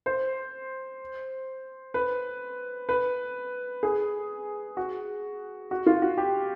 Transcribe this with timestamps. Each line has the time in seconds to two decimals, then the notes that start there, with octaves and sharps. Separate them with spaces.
0.06 C5
1.94 B4
2.89 B4
3.83 G#4
4.77 F#4
5.71 F#4
5.86 F4
6.02 F#4
6.18 G4